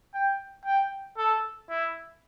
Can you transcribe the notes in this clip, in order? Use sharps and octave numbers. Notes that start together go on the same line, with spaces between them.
G5
G5
A4
E4